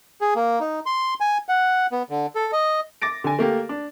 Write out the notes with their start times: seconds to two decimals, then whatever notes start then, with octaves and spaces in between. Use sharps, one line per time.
0.21 G#4
0.36 A#3
0.61 D#4
0.86 C6
1.20 G#5
1.49 F#5
1.92 B3
2.10 D3
2.35 A4
2.53 D#5
3.02 D6 A6 A#6 D7
3.24 D3 G#5
3.39 A3 A#3 G4
3.69 D4